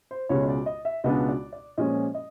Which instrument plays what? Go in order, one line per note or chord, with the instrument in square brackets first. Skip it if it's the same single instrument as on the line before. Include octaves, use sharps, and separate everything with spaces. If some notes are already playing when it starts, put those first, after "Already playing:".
[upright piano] C5
C#2 B2 G#3 C#5
D5
D#5
E5
C#2 B2 G#3 B3 D4 D#5
D5
D5
A#2 F3 G#3 C#4 D#5
D#5